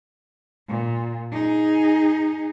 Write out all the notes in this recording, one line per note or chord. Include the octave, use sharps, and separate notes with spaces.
A#2
D#4 G#4